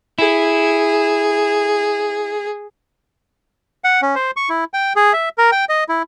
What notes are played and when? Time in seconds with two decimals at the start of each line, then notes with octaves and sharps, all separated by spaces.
0.19 E4 G#4
3.84 F#5
4.02 C#4
4.15 C5
4.37 C#6
4.49 E4
4.74 G5
4.96 G#4
5.13 E5
5.38 A#4
5.52 G5
5.69 D#5
5.89 E4